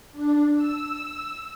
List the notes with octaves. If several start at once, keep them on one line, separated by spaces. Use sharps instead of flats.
D4
E6